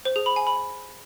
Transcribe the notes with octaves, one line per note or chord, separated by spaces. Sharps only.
C5
G#4
B5
G#5
B5